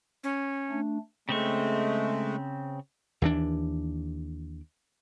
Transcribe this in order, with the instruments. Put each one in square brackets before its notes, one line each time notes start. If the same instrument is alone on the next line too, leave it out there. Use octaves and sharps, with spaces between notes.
[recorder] C#4
[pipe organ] A3 D4
[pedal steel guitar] C#3 C4 C#6 [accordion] G#3 A3
[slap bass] D#2 E3 D4